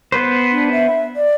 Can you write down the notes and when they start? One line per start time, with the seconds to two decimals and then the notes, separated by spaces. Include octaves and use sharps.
0.12 B3 B4 C5
0.51 D4
0.72 E5
1.16 D5